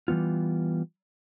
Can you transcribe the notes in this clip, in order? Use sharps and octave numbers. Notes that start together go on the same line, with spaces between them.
E3 G3 B3 F4